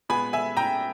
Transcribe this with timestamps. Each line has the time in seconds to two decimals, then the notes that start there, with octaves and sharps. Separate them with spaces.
0.09 A#2 G#3 B3 G#5 B5
0.33 E5 G#5
0.57 G5 A#5